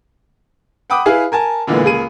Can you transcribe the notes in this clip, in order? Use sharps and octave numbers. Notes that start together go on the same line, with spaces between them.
F#5 G5 B5 D6 D#6
E4 G#4 B4 F5 G#5
A#4 G#5 A5
A#2 D3 E3 G#3 A#3 B3
C#2 A#3 G#4 D#7